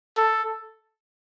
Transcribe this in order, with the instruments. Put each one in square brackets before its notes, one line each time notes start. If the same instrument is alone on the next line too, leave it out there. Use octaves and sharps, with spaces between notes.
[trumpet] A4